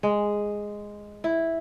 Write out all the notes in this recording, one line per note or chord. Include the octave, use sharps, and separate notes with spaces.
G#3
E4